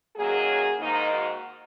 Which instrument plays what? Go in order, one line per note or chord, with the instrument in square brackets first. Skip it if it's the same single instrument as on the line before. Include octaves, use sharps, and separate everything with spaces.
[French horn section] F#2 D#3 F#3 A#3 G#4
G#2 D#3 A#3 D#4
F#4